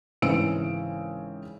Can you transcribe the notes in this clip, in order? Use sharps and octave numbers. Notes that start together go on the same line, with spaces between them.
G#1 C#3 E3 C4 E6 D7